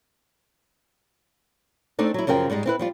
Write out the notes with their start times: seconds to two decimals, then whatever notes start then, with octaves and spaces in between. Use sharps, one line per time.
1.99 A3 C4 D4 D#4 D5
2.14 F#3 E4
2.27 F#2 C#3 F3 A#4 G5
2.50 G#2 G3 G#3 D#4
2.66 C4 E4 B4
2.79 F3 G3 F4